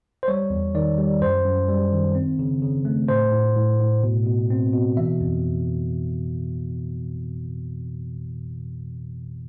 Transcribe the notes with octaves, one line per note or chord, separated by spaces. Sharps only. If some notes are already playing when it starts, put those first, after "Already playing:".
C5
G3 C#5
E2
D#3 D5
G3
F#2 C5
F#2
G3
D#3
C4
C#3
C#3
A3
A2 C5
A2
A2
A2
B2
B2
C4
B2
E3 E5
F2